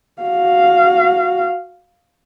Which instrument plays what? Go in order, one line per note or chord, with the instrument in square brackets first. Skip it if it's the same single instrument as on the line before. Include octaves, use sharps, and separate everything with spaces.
[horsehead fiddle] F#4 F5